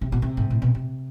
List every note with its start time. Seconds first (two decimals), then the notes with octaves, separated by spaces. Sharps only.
0.01 C3
0.12 B2
0.22 C3
0.37 G#2
0.50 A2
0.62 B2
0.75 C3